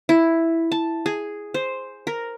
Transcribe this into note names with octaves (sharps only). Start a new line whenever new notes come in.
E4
A5
G#4
C5
A#4